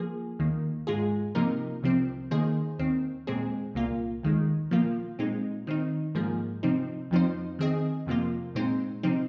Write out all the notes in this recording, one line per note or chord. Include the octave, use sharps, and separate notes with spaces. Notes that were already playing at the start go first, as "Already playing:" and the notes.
Already playing: F3 A#3 G#4
D#2 D#3 A#3
G#2 G#3 F4 G#4
C3 F3 A#3 D#4 A#4
C2 C3 F3 C4
D#3 A#3 G#4 C5 D#5
D#2 D#3 C4
A#2 G#3 C4 G#4
C2 A#2 A#3 F4
D#2 D#3 G#3
A#2 F3 A#3 F4
A#2 G#3 C4 D#4
D#3 C4 D#4
G#2 F3 A#3 G#4
C3 F3 C4 D#4
F2 F3 C4 D#4 C5
D#3 C4 G#4 D#5
F2 C3 F3 A#3 F4
A#2 G#3 C4 D#4 C5
C3 F3 C4 D#4